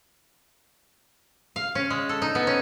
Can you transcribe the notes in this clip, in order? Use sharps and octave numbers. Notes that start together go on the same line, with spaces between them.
F5
C#4
G#3
A4
D#4
B3
C#4